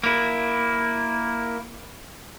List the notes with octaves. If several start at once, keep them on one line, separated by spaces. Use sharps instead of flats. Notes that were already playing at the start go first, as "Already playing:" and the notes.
A#3 E4